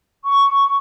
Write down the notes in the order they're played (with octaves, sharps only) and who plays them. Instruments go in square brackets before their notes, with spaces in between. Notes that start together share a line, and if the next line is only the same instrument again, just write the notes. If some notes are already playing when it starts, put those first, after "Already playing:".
[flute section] C#6